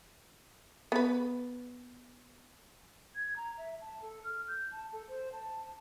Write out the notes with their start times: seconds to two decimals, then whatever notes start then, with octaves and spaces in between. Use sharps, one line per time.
0.92 B3 B4
3.15 G#6
3.36 A#5
3.58 E5
3.81 A5
4.02 A4
4.24 F6
4.48 G6
4.72 A5
4.93 A4
5.09 C5
5.33 A5